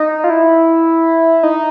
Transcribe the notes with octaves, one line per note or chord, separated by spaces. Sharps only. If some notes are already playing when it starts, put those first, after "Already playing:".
Already playing: D#4
F4
E4
D#4